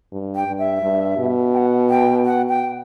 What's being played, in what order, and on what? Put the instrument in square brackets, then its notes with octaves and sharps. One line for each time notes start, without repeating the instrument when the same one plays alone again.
[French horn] G2
[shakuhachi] G5
[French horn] G2
[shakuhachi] E5
[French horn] G2
B2
[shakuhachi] G5
F#5
G5
F#5
G5